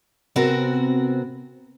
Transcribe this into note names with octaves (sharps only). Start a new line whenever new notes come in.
C3 B3 C4 F#4 A#4